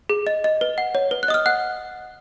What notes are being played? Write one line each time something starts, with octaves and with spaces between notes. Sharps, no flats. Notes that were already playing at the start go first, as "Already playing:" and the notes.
G#4
D#5
D#5
B4
F#5
C#5
B4
F#6
D#5 D#6
F6
F#5 F#6